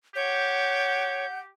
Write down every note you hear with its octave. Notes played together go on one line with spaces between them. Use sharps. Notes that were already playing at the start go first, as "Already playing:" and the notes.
G4 C#5 F#5 G6